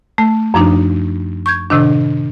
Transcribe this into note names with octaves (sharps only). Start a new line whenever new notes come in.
A3
F#2 F3 D4 D#4
C#6 G6 G#6
A2 C3 D#3 D4